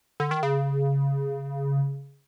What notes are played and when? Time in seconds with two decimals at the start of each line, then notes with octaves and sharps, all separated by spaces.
0.20 D3
0.31 D#3
0.43 C#3